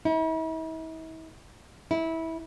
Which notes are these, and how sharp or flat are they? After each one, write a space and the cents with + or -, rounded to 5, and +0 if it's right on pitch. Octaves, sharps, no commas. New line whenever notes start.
E4 -45
E4 -20